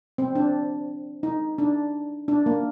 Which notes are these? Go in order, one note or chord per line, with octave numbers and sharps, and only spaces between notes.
C4
D4
D#4
D4
D4
A#3